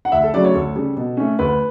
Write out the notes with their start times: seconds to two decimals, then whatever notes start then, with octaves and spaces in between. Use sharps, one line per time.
0.05 F#5
0.12 D2 E5
0.23 A4
0.34 C#3 F#3 A3 D5
0.45 C#5
0.54 D2 A4
0.76 C#3 G3
0.97 B2
1.17 A3 C#4
1.39 D2 B4